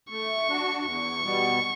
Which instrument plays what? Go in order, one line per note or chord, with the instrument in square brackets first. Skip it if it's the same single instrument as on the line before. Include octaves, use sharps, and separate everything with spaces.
[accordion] A3 [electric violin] C#6
[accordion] D4 F#4
[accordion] E2 [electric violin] C#6
[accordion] B2 G3 B3